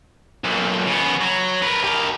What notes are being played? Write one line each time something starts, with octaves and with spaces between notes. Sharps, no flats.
B1 A#2
C#3 B3
F#3
A#4 B4
G4 A#4